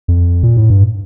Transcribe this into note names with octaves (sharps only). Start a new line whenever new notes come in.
F2
A#2
A2
G2